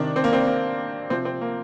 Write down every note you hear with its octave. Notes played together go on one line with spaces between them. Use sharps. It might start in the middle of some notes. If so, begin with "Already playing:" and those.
Already playing: C3 D#3 D4
C4
A#3
C4
A#3
C3 F3 C4
C4
A#3